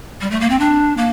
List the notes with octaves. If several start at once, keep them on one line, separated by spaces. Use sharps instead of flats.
G3
A3
A#3
C4
D4
A#3